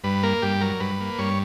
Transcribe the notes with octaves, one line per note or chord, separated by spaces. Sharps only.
G2 B4
A#3 A#4
G2 G4
F#3 A#4
G2 B4
A#3
G2 C#5